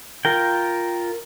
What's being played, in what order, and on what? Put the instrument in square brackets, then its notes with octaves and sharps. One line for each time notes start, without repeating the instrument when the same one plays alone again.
[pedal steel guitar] F4 A#4 G5